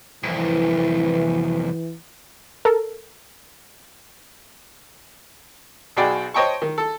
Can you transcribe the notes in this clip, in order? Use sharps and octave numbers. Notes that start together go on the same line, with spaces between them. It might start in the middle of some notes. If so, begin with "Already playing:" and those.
C2 F2 E3
A4 A#4
B1 B2 F#4 G#4 D5 G5
C5 C#5 D#5 G5 A5 C#6
D#3
A4